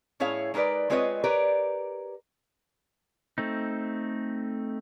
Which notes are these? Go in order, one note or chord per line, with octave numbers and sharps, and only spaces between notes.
A2 C#4 E4 G#4 C#5 F5
G#3 D#4 A#4 B4 D5
G#3 C4 F4 B4 C#5 D#5
G4 A#4 B4 C#5 D5
A3 C4 D#4